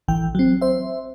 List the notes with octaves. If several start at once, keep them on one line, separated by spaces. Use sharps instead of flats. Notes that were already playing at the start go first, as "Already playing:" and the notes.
A1 E3 G5
F#3 C4
C5 E5